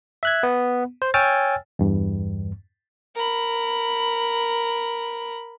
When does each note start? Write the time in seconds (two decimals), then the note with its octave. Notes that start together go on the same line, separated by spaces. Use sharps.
0.23 E5 F#6 G#6
0.43 B3
1.02 C5
1.14 C#5 G5 G#5 E6 F6 A6
1.79 E2 G2
3.15 A#4 B5